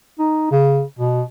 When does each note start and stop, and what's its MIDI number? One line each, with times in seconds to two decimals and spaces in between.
0.19 0.46 63
0.51 0.82 49
0.99 1.22 47